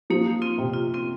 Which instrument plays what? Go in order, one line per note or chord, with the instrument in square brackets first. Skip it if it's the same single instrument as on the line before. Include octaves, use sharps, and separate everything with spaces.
[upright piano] F3 [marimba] A#3 D#4
[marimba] C4 F4
[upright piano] C3
[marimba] F4
C4 F4